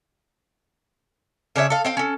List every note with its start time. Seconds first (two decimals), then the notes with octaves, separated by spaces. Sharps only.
1.56 C#3 D4 C#5 E5
1.70 A4 F5
1.85 C4 F5 G5
1.97 C#4 A4